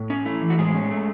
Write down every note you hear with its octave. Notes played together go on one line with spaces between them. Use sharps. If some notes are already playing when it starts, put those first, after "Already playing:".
Already playing: A2
C#4
A3 E4
E3
F#4
A2 G#3 G#4
C#4
A3